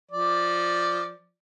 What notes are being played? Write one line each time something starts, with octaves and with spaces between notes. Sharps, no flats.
F3 D5